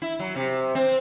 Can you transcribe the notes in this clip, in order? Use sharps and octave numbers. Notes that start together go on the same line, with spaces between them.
E4
F#3
C3
C4